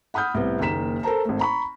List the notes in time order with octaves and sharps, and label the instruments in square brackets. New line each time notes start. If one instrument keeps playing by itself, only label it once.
[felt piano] F#5 B5 D#6 F6 G6
C2 A2 B3
F#1 D#3 A#3 A#5 B6 E7
A4 A#4 C5 A5 A#5
G#1 A3
A#5 B5 C#6